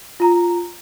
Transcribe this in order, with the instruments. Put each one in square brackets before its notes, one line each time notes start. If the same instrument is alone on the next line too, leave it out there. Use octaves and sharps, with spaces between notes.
[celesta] F4 A#5